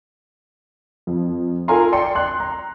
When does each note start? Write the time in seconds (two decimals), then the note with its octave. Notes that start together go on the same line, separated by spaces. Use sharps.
1.07 F2
1.68 F4 A4 A#4 G#5 A#5 C6
1.92 D5 G5 C6 C#7
2.15 C6 F#6
2.40 A#5